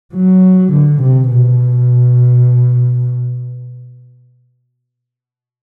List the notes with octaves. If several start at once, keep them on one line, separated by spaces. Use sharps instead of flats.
F#3
D3
C3
B2